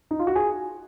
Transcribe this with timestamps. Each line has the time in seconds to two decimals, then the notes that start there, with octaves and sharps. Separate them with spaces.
0.11 D#4
0.19 F4
0.27 F#4
0.35 G#4